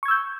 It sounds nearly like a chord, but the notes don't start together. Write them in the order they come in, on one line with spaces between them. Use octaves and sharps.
C#6 G#6 E6 G6